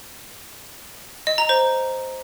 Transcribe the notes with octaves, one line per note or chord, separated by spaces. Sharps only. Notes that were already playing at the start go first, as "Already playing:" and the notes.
D#5
A#5
C5